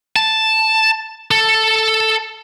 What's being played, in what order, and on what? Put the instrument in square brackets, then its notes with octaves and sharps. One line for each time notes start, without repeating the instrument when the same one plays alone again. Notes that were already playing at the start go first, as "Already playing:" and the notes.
[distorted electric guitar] A5
A4